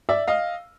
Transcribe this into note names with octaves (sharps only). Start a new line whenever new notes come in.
D5 E5
D#5 F5